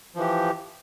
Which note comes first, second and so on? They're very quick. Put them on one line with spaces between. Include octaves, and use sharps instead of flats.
F3 E3 G4